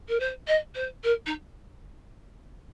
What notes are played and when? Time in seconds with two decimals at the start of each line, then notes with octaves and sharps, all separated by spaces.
0.09 A#4
0.20 C5
0.47 D#5
0.75 C5
1.04 A#4
1.26 D#4